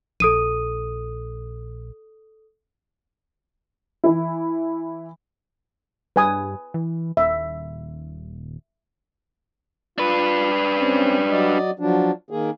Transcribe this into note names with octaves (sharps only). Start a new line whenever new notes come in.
A#1 A4 D#6 D#7
E3 E4
G2 B4 G#5 D#6
E3
D#1 E5
D4 F4 B4
C4 C#4
F#3 D5 D#5
F3 F#3 D4
D#3 A#3 G#4